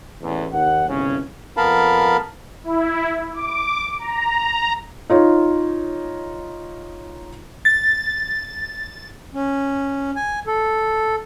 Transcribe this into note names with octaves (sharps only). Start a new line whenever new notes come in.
A1 E2
D#2 F#5
G1 C2 C#3 C#4
F2 B3 A#4 F5 A5 B5
E4
D6
A#5
D#4 F4 C#5
A6
C#4
G#5
A4